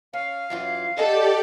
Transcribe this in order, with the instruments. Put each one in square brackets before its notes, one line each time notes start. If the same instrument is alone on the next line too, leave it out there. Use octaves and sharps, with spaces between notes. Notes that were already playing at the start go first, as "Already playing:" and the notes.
[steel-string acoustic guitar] C#4 [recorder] F5
[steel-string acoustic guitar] F#2 E3 F4
[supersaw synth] G4 D5 [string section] A4 [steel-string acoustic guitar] D#5 F#5